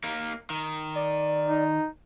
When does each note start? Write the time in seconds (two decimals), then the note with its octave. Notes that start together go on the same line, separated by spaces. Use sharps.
0.04 A#3 D#4
0.50 D#3
0.95 D5
1.48 D#4